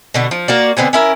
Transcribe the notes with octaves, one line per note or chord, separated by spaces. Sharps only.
B2 D3 B3
F3
A#3 F#4 D5
D3 B3 C4 G#5
C#4 E4 A#4